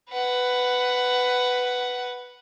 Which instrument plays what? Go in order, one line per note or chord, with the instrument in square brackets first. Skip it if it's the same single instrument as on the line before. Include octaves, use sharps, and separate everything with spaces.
[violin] B4 F#5